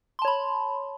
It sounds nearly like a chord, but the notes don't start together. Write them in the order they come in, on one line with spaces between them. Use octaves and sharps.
C6 A5 C#5 B5